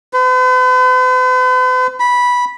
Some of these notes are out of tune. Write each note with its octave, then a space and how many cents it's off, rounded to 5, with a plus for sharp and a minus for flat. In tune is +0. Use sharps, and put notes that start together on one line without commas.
B4 +45
B5 -10